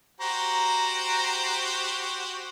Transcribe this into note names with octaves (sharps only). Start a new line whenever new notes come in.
F#4 G4 C5 A#5